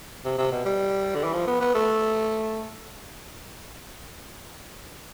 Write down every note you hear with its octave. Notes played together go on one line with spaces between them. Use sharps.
C3
C3
B2
G3
D3
E3
F3
B3
B3
A3